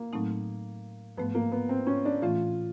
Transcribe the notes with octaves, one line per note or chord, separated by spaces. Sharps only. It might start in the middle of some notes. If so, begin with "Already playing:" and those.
Already playing: A#3
A2 F#3 A3 C4 D#4
G#2 F3 A3 B3
A#3
B3
C4
C#4
D4
A2 E3 A3 C#4 F4